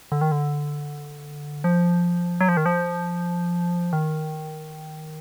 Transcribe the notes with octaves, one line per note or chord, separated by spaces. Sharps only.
D3
D#3
D3
F3
F#3
F3
D#3
F3
D#3